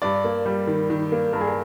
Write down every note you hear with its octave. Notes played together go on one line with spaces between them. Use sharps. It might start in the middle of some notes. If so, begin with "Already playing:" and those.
G2 D5
A#3
G3
D#3
D#3
A#3
G2 A#4
G#4
A#4